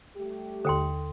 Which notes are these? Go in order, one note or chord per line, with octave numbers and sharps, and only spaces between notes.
G3 A3 G4
D#2 D3 A4 G5 C6